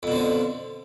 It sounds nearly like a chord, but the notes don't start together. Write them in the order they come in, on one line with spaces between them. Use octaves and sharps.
F2 B2 D3 F3